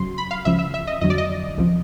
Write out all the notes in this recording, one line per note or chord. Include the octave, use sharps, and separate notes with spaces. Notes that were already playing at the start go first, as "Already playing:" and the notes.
Already playing: F#2 C#3 F#3 C6
B5
F5
C#2 C#3 F3 E5
E5
E5
D#5
F2 D3 F#3 D#5
D5
D#5
C#2 C3 F3